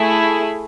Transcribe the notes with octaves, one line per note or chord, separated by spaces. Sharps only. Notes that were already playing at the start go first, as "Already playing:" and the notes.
Already playing: A3 E4 G#4